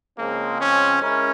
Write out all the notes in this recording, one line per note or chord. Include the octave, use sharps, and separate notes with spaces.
C#3 F3 G#3 A#3 C4
C#4
G#3 C#4 E4 A#4